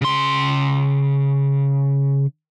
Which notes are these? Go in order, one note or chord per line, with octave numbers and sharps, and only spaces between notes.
C#3 C6